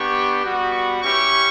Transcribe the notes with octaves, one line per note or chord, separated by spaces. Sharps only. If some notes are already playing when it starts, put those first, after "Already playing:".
Already playing: B3 D4 G4 C#6
G3 B3 F#4
C#6
C#4 E4 G4 C#6